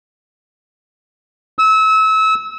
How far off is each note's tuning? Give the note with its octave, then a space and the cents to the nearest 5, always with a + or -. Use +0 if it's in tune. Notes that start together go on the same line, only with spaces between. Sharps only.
E6 -30